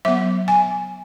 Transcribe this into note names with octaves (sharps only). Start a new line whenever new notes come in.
F#3 B3 E5
G#5